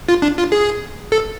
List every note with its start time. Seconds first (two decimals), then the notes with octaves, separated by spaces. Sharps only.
0.09 F4
0.22 D4
0.38 F4
0.52 G#4
1.12 A4